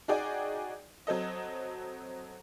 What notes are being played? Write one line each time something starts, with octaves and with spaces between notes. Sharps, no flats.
D#4 F#4 G#4 D5 G5 G#5
F#3 C4 A4 D#5